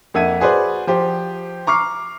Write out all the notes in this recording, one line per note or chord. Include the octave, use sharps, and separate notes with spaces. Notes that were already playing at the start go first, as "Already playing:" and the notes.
F2 A#3 E5 F#5 G#6 D#7
F#4 G#4 B4 C5 D5
F3 G4 C5
A#5 C#6 D6 F6 C7